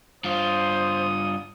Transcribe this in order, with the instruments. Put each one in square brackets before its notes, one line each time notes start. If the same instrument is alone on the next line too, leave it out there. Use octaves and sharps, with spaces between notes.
[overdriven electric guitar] G2 F4 [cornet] C5 [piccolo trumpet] D#6